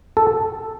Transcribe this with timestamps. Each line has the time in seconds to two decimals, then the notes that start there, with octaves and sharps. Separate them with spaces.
0.17 A4